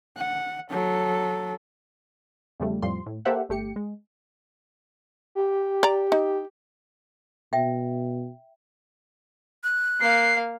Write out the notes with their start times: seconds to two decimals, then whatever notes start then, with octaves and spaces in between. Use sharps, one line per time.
0.18 F#5
0.70 F#3 A4
2.60 E2 C#3 F3 G3 A3
2.82 F2 A2 F3 G3 C6
3.06 A2
3.25 A#3 G4 A4 C5 E5 F#5
3.49 G1 A3 G4 C#7
3.76 G#3
5.35 G4
5.83 D5 A#5
6.12 D#4
7.53 B2 E5 G5
9.64 F#6
10.00 A#3 F5 C7